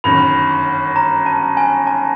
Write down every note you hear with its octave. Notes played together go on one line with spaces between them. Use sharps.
G1 F#2 D#3 B5
A#5
A5
G#5
A5